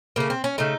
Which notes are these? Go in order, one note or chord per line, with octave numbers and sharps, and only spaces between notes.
C#3 A3 A#3
C4
C#4
C#3 A3 D#4